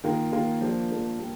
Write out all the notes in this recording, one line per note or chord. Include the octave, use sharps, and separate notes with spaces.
D#3 A#3 F4 A#4
D#3 A#3 F4 A#4
F3 A#3 D4
F3 A#3 D4
G3 A#3